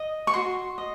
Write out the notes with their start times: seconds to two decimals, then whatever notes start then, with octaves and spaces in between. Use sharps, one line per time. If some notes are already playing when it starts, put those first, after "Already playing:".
Already playing: D#5
0.27 C#6
0.34 F#4 C6
0.78 D#5